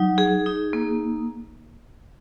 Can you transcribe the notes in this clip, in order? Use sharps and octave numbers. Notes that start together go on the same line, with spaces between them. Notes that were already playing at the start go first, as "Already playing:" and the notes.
Already playing: F#3 D#4
G#4
D#4
A#3